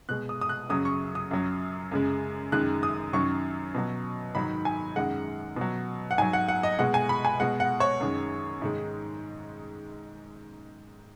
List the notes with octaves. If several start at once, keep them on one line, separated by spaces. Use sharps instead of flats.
B2 G#3 F#6
D#6
D#6
F#6
F#2 C#3 F#3 D#6
C#6
D#6
F#2 F#3
F#2 C#3 G#3
F#2 D#3 G#3 F#6
D#6
F#2 D#3 F#3 C#6
B2 F#3
G#2 D#3 F#3 B5
G#5
F#2 D#3 G#3 F#5
B2 F#3
F#5
G#2 F#3 G#5
F#5
F#5
D#5
B2 G#3 F#5
G#5
B5
G#5
B2 G#3 F#5
F#5
C#5
F#2 D#3 G#3
G#2 D#3 G#3